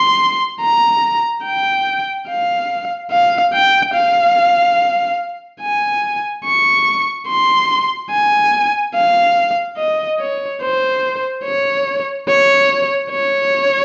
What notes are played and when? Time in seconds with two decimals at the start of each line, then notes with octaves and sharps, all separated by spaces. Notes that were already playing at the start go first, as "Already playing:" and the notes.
Already playing: C6
0.61 A#5
1.45 G5
2.29 F5
3.11 F5
3.53 G5
3.95 F5
5.62 G#5
6.45 C#6
7.28 C6
8.11 G#5
8.95 F5
9.78 D#5
10.20 C#5
10.62 C5
11.45 C#5
12.28 C#5
13.11 C#5